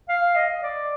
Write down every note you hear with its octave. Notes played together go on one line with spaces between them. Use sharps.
F5
D#5
D5